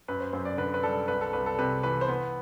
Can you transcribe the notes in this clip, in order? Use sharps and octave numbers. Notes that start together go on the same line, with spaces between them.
F#2 B4
C5
F#2 C5
D5
D3 B4
B4
G3 A4
C2 B4
A4
C2 B4
A4
C3 B4
E3 B4
C5
B3 B4